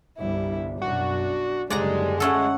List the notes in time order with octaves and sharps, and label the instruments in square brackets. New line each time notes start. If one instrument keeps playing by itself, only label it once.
[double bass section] G1 C2 G3 [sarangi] E4
[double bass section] B1 F#2 [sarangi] D4 [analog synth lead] F#4
[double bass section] F#1 G#2 D3 [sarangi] G3 [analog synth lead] G#3 [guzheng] D5 F#5 A#5
[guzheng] A3 C#4 A4 [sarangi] F#5